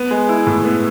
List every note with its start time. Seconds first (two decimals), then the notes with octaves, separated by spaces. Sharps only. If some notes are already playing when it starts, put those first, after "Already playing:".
Already playing: B3
0.11 G#3
0.29 E4
0.47 A2
0.64 B3